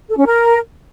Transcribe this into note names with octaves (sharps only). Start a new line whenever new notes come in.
A4
C#4
A#4